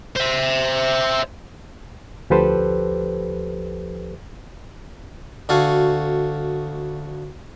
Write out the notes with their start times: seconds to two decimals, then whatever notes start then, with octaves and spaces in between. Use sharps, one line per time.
0.16 C5 E5
2.30 D2 F3 G4 A4 B4 C5
5.49 D2 F#4 A4 F5 G#5